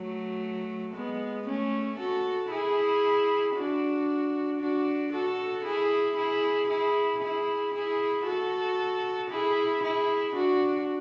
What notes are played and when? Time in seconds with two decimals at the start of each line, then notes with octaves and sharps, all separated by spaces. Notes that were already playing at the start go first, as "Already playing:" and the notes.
Already playing: F#3 A3
0.95 G#3 B3
1.47 A3 C#4
1.99 F#4 A4
2.51 E4 G#4
3.56 D4 F#4
4.61 D4 F#4
5.13 F#4 A4
5.65 E4 G#4
6.17 E4 G#4
6.69 E4 G#4
7.21 E4 G#4
7.74 E4 G#4
8.27 F#4 A4
9.30 E4 G#4
9.83 E4 G#4
10.35 D4 F#4